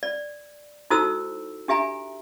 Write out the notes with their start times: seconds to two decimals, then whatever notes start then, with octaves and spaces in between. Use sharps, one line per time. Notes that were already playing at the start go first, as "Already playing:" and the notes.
0.03 D5
0.90 D#4 E4 F#4 A4 C5 E6
1.68 D4 G4 E5 G#5 A#5